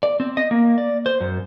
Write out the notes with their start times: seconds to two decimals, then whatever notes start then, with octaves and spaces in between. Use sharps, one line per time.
0.03 D5
0.20 C4
0.37 D#5
0.51 A#3
0.78 D5
1.06 C5
1.21 F#2